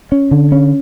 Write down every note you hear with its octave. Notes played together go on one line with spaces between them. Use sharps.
C#4
D3
C#4